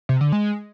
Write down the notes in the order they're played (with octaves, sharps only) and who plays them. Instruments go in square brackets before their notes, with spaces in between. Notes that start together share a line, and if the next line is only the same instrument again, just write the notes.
[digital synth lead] C3
D3
G#3